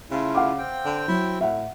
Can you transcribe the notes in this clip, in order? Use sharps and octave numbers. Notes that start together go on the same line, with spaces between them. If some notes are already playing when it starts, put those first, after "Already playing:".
C#3 A3 E4 F4
F5 F#5 D6
C4 G5
D3
F#3 E4
A2 E5 F#5